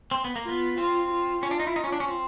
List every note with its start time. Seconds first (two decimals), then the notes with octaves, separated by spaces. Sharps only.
0.11 C4
0.25 B3
0.36 A#3
0.44 B3 F4
0.77 C4 F4
1.10 F4
1.43 C#4 F4
1.51 D4
1.60 D#4
1.67 E4
1.76 D#4
1.84 C#4
1.92 D4
2.00 C#4
2.08 C4